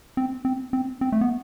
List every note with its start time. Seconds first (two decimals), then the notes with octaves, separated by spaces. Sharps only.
0.17 C4
0.45 C4
0.73 C4
1.01 C4
1.12 A3
1.21 B3